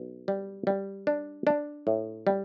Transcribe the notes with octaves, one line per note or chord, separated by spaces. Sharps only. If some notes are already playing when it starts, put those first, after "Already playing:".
Already playing: B1
G3
G3
D4
D4
A2
G3